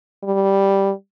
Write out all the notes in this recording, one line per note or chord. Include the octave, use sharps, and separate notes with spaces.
G3